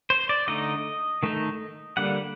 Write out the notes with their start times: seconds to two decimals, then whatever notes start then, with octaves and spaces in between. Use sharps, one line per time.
0.10 C5
0.29 D5
0.48 D3 A3 D#4 D#5
1.23 D#3 A3 D#4
1.97 D3 G3 A#3 D4 F#5